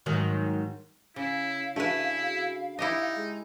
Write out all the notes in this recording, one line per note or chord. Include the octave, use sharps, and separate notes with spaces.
G#2 D#3 F#3
C#3 E4 F5
A3 D4 E4 F#4 G#4 B4
D#4 E4 G4 D#5
G#3